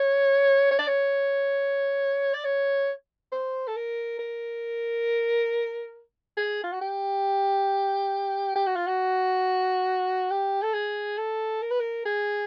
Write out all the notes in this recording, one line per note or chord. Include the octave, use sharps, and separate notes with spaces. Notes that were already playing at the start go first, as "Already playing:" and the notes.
Already playing: C#5
C#5
D5
C#5
D5
C#5
C5
A4
A#4
A#4
G#4
F4
F#4
G4
G4
F#4
F4
F#4
G4
A4
G#4
A4
A#4
B4
A#4
G#4